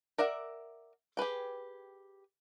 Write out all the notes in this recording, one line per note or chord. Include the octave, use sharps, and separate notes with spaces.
A#4 D5 E5 F#5
G4 G#4 B4 G5